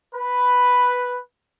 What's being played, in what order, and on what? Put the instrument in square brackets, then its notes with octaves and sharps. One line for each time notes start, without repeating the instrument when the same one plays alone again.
[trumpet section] B4